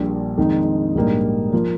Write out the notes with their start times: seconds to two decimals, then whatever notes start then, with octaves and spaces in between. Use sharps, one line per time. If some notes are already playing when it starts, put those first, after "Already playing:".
Already playing: A#1 A#2 G3
0.38 F2 D#3 G#3 D#4
0.95 A#1 G#2 G3 A#3 D#4
1.53 F3 A#3